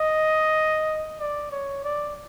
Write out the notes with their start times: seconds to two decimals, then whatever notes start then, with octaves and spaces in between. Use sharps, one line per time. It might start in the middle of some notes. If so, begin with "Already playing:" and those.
Already playing: D#5
1.20 D5
1.51 C#5
1.84 D5